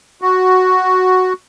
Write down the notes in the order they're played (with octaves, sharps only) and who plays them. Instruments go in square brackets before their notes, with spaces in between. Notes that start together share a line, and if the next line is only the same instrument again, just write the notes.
[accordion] F#4